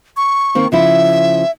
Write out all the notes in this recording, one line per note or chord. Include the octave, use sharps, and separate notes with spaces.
C#6
D#3 A#3 C4
C#3 F3 E4 E5